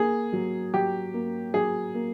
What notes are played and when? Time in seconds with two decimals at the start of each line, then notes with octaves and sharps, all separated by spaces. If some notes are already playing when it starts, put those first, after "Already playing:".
Already playing: A#3 G#4
0.33 F#3
0.73 F#3 G4
1.14 A#3
1.54 F#3 G#4
1.94 A#3